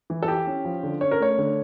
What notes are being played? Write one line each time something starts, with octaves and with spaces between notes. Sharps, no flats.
E3
A4
E4 G4
C#4
F3
D3
C#4 C#5
A#4
A3 C#5
D3